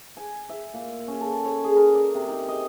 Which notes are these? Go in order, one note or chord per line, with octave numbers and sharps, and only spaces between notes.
G#5
E5
A#2
C#4
A4
C#5
G#4
A#4
D5
C3
D#4
D#5